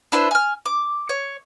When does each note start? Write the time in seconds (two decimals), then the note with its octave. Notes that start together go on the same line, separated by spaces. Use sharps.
0.12 D4 E4 B4 C5
0.31 G#5 F6
0.66 D6
1.09 C#5